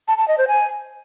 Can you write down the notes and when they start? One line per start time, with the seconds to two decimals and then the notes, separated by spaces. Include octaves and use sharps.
0.08 A5
0.18 A5
0.28 D#5
0.38 C5
0.48 G#5